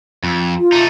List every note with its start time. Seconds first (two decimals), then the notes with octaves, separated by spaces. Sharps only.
0.24 F2
0.59 F4
0.72 A3 D#4